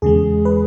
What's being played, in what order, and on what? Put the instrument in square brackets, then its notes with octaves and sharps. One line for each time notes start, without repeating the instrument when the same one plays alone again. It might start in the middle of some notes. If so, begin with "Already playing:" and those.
[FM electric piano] E2 C#3 G#3 G#4
B4